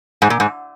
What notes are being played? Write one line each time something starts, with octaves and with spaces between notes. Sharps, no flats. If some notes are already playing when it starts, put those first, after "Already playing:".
G#2
A#2
G#2